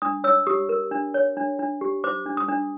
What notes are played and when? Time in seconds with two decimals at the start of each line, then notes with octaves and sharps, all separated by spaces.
0.02 D4 D#6
0.24 C#5 E6
0.47 G4 D#6
0.69 A#4
0.91 D4
1.14 C#5
1.37 D4
1.59 D4
1.81 G4
2.04 C5 D6
2.26 D4
2.37 D#6
2.48 D4